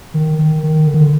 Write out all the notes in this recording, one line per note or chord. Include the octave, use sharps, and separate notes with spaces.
D#3
D#3
D#3
D3
D#3
D3